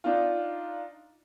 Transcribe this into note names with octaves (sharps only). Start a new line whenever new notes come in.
D4 D#4 F4